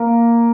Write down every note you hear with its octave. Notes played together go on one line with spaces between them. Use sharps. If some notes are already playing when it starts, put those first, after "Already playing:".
Already playing: A#3